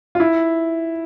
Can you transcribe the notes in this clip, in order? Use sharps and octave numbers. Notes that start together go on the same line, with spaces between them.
F4
E4